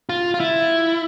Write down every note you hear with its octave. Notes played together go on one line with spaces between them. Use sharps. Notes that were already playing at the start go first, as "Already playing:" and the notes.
F4
F4
E4